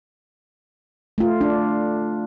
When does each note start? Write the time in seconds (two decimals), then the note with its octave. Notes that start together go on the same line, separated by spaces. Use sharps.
1.18 A3 F4
1.41 D4